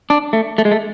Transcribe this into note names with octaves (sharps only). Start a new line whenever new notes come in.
D4
A3
A3
G#3
A3